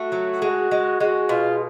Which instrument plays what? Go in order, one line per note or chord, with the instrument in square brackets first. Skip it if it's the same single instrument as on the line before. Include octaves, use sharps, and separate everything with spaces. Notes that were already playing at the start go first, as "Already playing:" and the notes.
Already playing: [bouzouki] A3 [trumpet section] F#4
[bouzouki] F#3
G#3
G#3
[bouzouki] G#3 [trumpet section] F#4
[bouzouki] B2 [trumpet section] F4